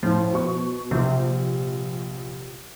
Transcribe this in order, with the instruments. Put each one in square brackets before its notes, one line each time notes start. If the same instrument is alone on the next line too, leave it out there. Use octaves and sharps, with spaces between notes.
[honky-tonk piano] A2 [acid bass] F3
[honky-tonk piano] B2 C#6
[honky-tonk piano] A#1 [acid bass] C3